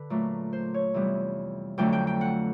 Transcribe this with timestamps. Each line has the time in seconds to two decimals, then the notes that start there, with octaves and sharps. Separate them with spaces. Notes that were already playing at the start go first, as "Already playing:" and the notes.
Already playing: D3 B4
0.10 A#2 F#3 A3
0.53 C5
0.74 C#5
0.94 F2 C3 E3 G3 B3
1.78 F2 D3 F#3 A3 G5
1.93 G5
2.07 G5
2.21 F#5